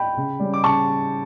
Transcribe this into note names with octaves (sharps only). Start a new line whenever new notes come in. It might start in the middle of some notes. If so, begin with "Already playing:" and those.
Already playing: G5 B5
C#3
G3 C#4
D6
C#3 A5 C#6